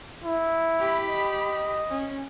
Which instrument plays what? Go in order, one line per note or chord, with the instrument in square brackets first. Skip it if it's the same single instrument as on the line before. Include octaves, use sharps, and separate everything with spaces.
[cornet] E4
[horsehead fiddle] G4 B5
[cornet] D#5
[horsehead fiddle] C#4